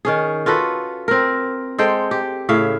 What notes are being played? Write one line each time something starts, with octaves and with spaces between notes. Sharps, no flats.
D#3 C#4 G#4
F4 F#4 A4 B4
C4 A#4
G#3 A4 C5 G5
G4
A2 C#3 E5 F5